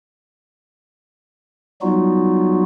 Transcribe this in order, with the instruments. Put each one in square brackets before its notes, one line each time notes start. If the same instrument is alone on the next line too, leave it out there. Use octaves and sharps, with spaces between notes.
[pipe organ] F#3 G3 B3 D#4 F4 F#4